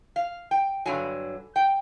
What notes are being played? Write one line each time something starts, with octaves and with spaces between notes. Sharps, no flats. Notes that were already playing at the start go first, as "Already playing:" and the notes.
F5
G5
G2 D3 F#3 G#5
G5